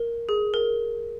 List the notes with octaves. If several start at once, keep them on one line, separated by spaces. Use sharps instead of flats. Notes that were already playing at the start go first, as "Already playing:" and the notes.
Already playing: A#4
G#4
A#4